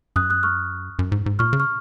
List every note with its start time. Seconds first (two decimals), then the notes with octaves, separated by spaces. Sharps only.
0.16 F#2 D#6 F#6
0.30 D#6 F#6
0.43 C#6 F6
0.99 F#2
1.12 G#2
1.26 G#2
1.39 A#2 C#6 F6
1.53 C#3
1.60 C#6 F6